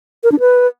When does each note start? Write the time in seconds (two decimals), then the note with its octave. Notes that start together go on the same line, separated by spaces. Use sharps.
0.24 A#4
0.32 D4
0.40 B4